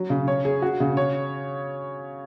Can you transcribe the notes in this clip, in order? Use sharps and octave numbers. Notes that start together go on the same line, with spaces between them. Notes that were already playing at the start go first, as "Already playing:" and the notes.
Already playing: F#3
C#3
C#5
G#4
F#4
C#3
C#5